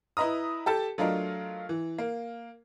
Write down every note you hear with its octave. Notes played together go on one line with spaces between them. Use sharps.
E4 B4 D#5 A#5 D#6
G4 A4 A5
F#3 A3 D4 F4 A#4 D#5
E3
A#3